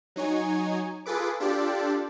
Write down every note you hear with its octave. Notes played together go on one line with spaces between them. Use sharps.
F#3 D#4 C#5 G#5
F4 G#4 A4 B4 D6
D4 F4 G4 A4 D5